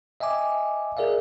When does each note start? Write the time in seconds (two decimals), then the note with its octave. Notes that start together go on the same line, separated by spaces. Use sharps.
0.20 D#5 E5 G5 G#5 D6
0.97 G#4 A#4 D5 E5 F5